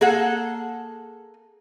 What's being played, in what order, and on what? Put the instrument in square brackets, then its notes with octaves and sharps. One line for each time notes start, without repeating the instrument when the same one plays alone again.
[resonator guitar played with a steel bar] A#3 G#4 A4 F#5